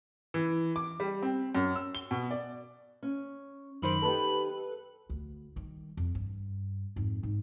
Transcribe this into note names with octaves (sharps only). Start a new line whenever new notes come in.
E3
D6
G3
C4
F#2
E6
G7
B2
D5
C#4
F#2 D#3 C5 B5
B3 D#4 G4 A4 B4
D2
D#3 G3
F2
G2
F2 G#2
G#2